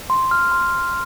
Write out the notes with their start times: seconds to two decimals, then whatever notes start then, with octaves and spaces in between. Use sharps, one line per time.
0.10 C6
0.31 F6
0.52 C6